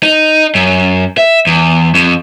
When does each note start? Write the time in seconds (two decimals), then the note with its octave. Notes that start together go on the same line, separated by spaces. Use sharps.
0.03 D#4
0.55 F#2
1.18 E5
1.47 E2
1.95 F2